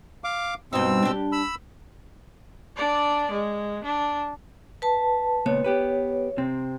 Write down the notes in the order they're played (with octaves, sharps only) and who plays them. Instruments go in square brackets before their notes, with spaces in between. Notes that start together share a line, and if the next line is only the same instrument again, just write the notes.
[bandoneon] F5 D6
[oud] G2 D#4 [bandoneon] B2 C4 E6
[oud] D4 G4
[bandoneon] B5 E6
[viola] D4 D5
G#3
D4
[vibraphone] B4 A5
[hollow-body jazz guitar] C#2 A#2 B3 [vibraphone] C#5
[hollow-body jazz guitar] B3 G4 B4
C3 C4